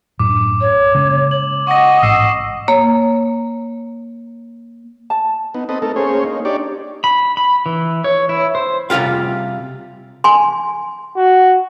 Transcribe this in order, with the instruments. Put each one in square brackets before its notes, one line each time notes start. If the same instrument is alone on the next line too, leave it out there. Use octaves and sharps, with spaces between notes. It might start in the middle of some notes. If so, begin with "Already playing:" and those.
[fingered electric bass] F#2 A2 D4 [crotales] D6
[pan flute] C#5
[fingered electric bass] C#3 G#3 A#3
[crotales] F#7
[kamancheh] D#5 [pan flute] F#5 [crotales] C#6 A#6
[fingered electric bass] A1 G#2 [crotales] E6 C7 E7
[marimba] A#3 C#5
[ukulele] A5
[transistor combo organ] B3 D#4
C4 A4 B4 D#5
A3 D#4 A4 A#4
A#3 C#4 G#4 C5 C#5
A#3 D#4
D4 D#4 G4 C#5 D5
[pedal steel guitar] B5
B5
E3
C#5
E4
C5
[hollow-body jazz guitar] C3 G3 F4 G4 F5
[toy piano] G#5 C6
[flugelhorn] F#4